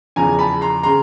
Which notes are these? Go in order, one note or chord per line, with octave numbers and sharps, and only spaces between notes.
E2 C#3 F3 G#5 A#5
A#5
A5 B5
A#5 C6
C#3 A#5 C6